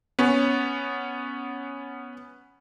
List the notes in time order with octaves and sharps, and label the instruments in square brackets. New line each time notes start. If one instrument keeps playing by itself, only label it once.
[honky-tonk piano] B3 C#4